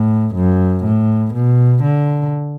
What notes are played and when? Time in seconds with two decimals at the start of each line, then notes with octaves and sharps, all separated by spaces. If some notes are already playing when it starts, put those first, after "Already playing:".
Already playing: A2
0.35 F#2
0.84 A2
1.34 B2
1.83 D3